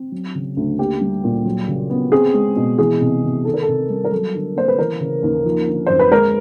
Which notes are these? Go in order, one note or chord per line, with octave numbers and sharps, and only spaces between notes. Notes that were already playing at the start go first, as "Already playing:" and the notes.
Already playing: C4
F#3
C#3
D2
A#3 G4
G3
A#2
F#3
C#3
B3
C4 G#4
G#3
B2
E3 G#4
C3
C2
D#3 A4
A#4
A4
C3
G3
A#4
F#3 A4
D3
A#3 C5
B4
E3 A#4
C#3
D#2
F3
D3
F#2 C5
B4
G#3 A#4